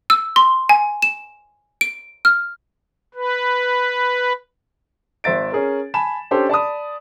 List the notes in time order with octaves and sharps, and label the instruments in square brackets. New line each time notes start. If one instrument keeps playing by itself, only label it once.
[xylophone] E6
C6
G#5
E7
D7
F6
[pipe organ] B4
[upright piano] G#1 C5 E5 A6 D7
C#4 G#4 A#4
G#5 A5 B5 E7
C#4 D4 G4 A4 C5
D5 A5 B5 D#6